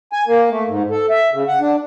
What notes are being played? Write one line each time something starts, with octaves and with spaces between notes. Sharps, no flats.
G#5
A#3
A3
G#2
A4
E5
C#3
F#5
D4